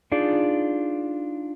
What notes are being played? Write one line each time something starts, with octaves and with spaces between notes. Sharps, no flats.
D4 D#4 F4 G#4 D5